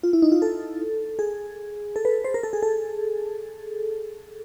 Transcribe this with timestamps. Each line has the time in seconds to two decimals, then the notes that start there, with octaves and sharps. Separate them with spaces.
0.03 F4
0.13 E4
0.22 D#4
0.32 F4
0.42 A4
1.19 G#4
1.96 A4
2.05 B4
2.25 C5
2.34 A#4
2.43 A4
2.53 G#4
2.63 A4